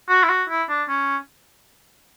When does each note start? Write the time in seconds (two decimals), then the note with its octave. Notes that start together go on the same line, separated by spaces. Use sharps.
0.09 F#4
0.23 E4
0.29 F#4
0.49 E4
0.69 D4
0.88 C#4